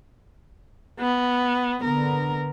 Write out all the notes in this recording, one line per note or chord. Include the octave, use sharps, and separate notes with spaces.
B3
D3 B3 A#4